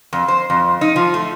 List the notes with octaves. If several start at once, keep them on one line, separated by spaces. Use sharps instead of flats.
F2
C5
F2
D#4
F3
A3